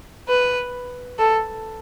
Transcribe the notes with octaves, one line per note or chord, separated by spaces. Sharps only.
B4
A4